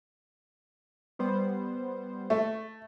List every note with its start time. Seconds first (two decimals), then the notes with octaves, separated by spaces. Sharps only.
1.19 G3 B3 C5
2.30 A3